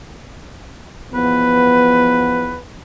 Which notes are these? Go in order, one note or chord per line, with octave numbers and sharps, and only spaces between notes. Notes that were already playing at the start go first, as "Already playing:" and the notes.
E2 F3 B3 B4